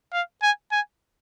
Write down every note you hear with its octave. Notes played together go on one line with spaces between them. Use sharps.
F5
G#5
G#5